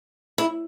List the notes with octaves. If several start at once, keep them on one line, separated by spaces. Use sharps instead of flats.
E4